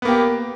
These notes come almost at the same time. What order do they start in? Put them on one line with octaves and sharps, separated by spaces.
B3 A#3 G4